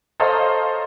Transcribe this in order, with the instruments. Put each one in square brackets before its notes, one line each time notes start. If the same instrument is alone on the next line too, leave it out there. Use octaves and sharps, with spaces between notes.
[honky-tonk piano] A4 C5 C#5 D#5 F5 A#5